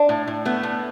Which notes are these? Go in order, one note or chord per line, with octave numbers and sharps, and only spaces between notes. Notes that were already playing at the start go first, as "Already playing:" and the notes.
Already playing: D4
A2
A2
A3 B3
A2